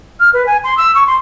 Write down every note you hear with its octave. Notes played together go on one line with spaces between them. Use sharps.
F6
B4
G#5
C6
E6
C#6
C6